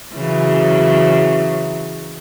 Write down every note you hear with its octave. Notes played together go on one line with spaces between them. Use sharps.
C#3 E3 F#3